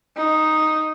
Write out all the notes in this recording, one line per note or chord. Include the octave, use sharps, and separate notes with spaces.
D#4